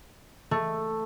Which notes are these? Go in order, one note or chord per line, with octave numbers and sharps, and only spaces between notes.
A3